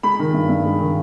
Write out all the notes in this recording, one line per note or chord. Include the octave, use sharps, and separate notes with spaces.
G#3 B5
D#3
G2
G2
G#3
D#3